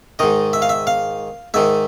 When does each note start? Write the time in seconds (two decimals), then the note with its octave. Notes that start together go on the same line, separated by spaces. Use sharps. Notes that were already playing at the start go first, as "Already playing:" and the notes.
0.19 G#2 D#3 D#5
0.53 E5
0.62 F5
0.69 E5
0.87 F5
1.54 G#2 D#3 E5